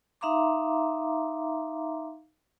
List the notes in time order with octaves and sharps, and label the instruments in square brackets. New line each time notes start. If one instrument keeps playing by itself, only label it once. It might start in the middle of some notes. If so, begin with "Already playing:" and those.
[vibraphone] D#4 E5 F5 A#5 C6 D6